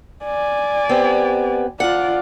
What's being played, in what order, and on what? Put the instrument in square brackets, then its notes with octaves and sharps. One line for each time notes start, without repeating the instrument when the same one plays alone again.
[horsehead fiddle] D5 G#5
[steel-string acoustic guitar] B3 C4 G4
[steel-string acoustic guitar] D2 F#5 [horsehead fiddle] F4 D5